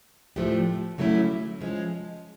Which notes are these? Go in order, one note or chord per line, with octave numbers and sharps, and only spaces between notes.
A2 F3 A3 D4 G4
D3 F#3 A3 C#4 E4
F3 G#3 C#4